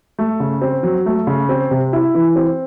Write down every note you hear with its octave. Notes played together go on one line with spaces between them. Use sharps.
A3
C#3
C4
F#3
A3
C#3
C4
C3
E4
E3
C4